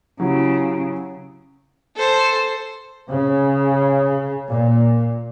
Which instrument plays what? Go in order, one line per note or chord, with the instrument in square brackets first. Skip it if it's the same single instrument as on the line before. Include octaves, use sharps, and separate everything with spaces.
[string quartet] C#3 [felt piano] F#3 E4 G4
[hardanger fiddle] A4 C5
[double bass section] C#3
A#2